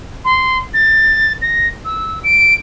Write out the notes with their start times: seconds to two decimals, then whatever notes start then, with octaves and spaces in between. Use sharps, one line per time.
0.25 C6
0.74 A6
1.42 A#6
1.85 E6
2.24 D7